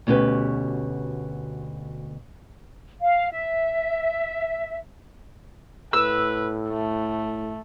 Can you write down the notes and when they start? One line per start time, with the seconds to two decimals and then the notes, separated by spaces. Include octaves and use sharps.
0.07 D2 B2 C#4 G4 B4
3.00 F5
3.31 E5
5.93 A2 B4 E6
6.69 A3